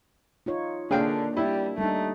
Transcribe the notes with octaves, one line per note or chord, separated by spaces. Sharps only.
D#4 F4 C#5
D3 A#3 D4 G#4 F5 G5
G3 E4
G3 A3 D4 D#4